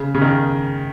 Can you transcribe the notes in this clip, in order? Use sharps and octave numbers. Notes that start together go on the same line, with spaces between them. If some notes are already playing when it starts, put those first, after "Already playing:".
Already playing: C#3
C#3
D#3